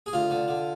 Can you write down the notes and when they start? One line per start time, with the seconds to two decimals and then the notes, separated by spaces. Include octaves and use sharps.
0.06 G#4
0.13 D2 F4
0.30 D3
0.48 D3